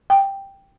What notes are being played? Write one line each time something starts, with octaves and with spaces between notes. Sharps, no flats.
G5